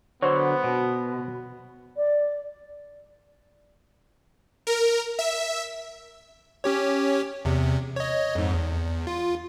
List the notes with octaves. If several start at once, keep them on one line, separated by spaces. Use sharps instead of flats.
D3 F#3 B3 C5 C#5
B2
D5
A#4
E5
C#4 G4 C#5
E2 C3
C#5 D#5
F2 G#2
E2
F4